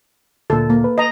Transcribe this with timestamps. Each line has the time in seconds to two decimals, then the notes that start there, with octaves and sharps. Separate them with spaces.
0.50 D2 A#2 A4
0.70 A#3
0.84 B4
0.98 D#5 A#5